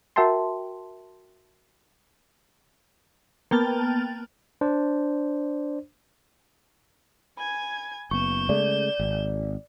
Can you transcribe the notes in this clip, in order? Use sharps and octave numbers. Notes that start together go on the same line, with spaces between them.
F#4 A#4 E5 G5 A5 C6
A#3 B3 G5 A5 F6 A6
D4 C5 D5
G#5 B5 G#6
F#1 B3 C#6 G6 E7
C#3 G#3 A3 D5
G#1